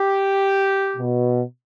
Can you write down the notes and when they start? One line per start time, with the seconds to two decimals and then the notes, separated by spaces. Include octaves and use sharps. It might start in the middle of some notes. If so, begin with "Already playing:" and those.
Already playing: G4
0.96 B2